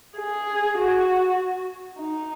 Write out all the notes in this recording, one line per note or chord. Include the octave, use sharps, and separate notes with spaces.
G#4
F#4
D#4